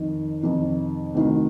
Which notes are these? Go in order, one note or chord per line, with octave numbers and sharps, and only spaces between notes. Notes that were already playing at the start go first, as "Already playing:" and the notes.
Already playing: F2 D#3
F2 C3 D#3
D2 C3 D#3